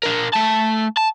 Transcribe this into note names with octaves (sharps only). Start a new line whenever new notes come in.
D4 A#4
A3 A5
A5